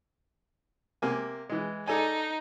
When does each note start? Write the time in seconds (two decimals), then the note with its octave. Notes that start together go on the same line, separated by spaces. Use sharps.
1.02 C3 A#3 G#5
1.49 E3 G#3
1.88 D#4 A4 D5 G#5